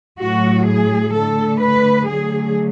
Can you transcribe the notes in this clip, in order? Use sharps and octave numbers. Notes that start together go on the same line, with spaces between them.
A2 F#3 A3 F#4
G#4
D3 A3 A4
B4
D3 F#3 A3 G#4